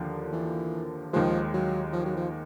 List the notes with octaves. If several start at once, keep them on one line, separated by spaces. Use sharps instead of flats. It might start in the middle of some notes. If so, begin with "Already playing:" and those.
Already playing: D#2 D3 F3 A#3
E3
D#2 D#3 F3 G#3
F#3
F3
F#3
F3